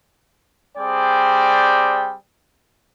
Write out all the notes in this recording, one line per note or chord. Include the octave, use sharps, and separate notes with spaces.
G3 C4 G#4 D5 G5